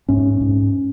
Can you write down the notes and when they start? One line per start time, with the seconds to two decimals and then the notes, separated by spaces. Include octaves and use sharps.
0.09 G#2 C#4
0.41 G#2